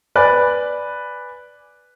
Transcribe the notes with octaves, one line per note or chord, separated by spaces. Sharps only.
B4 D5 G#5 F#6